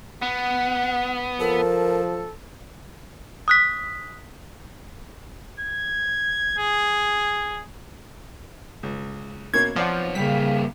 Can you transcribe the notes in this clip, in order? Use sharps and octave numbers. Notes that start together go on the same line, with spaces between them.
B3 F#5
F3 A4 A#4
D#6 F#6 B6
G#6
G#4
C#2
B2 A#3 C#4 G#6
F3 B3 C4 C#5 D5 F#5
C#3 G3 A#3 B6